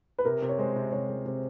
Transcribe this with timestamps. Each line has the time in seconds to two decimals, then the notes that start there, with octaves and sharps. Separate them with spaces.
0.19 B4
0.25 C3 A#4
0.42 C3
0.49 C#5
0.58 G#3 C5
0.76 C3
0.92 C3 C#5
1.09 G#3
1.26 C3 C5